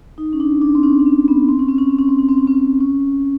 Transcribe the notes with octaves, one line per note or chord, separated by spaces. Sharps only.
D#4
C#4
D4
D4
C4
C#4
C#4
C4
B3
C4
C#4
C4
C#4
C4
C#4
C4
C#4
C4
C#4
C4
C#4